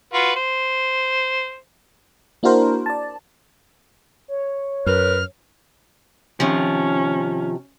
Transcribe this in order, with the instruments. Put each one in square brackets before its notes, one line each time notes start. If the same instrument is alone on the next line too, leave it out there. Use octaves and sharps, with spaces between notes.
[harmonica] F4 F#4 B4
C5
[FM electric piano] A#3 D4 E4 F#4 A#4 C5
D5 A5
[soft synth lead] C#5
[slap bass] F#2 [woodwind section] A#4 B4 [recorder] F6
[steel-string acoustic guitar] C3 D#3 F3 [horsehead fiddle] C#4